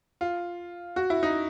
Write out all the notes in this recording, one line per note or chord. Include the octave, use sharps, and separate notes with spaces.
F4
F#4
E4
D#4